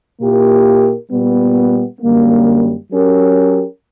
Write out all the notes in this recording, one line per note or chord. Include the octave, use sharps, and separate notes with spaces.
A#2 A#3 E4 G4 A#4
A#2 G3 B3
F#2 D3 G3 A#3
F#3 C#4 G4 A#4